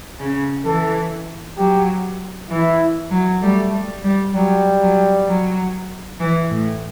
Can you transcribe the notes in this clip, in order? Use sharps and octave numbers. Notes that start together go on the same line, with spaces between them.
C#3
E3 A4
F#3 G4
E3 E4
F#3
G3 A3
G3
G3
F#3 G3
F#3
F#3
E3
A2